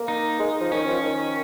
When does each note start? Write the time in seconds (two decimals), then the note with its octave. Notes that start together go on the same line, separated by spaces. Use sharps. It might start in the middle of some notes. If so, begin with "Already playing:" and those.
Already playing: A#3
0.08 D#4
0.40 G#3
0.60 F3
0.72 D#3 C#4
0.87 F3
1.03 D#3